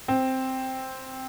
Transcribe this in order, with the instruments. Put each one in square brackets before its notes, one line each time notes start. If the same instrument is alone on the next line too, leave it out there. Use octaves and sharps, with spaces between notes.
[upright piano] C4